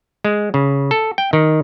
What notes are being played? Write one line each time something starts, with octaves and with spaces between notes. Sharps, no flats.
G#3
C#3
A4
G5
D#3